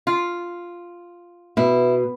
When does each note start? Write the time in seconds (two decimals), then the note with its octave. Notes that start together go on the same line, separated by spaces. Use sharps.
0.07 F4
1.57 B2 E4